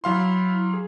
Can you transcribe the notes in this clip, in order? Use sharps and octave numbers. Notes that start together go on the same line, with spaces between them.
F#3 E4 F5 C6
G#4